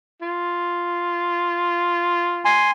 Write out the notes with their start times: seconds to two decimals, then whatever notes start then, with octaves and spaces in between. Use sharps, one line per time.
0.22 F4
2.45 G#5 C6